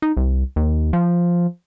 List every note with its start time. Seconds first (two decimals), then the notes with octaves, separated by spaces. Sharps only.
0.02 D#4
0.17 C2
0.56 D#2
0.93 F3